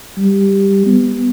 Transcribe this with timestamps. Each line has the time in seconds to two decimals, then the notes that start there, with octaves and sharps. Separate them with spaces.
0.17 G3
0.86 B3